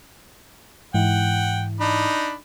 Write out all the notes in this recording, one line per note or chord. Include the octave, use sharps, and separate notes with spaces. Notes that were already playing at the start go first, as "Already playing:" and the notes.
G#2 E3 E4 F#5 G5
D4 D#4 B5